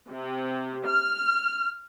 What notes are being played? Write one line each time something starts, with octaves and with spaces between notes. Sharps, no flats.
C3
F6